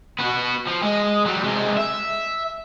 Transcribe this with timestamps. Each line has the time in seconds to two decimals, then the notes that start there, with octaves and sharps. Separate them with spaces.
0.19 B3 F#4
0.67 F3
0.83 G#3
1.26 F#3 G3
1.44 C3 G#3
1.77 E5